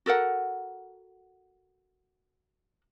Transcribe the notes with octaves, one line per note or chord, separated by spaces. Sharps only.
F#4 A4 A#4 F#5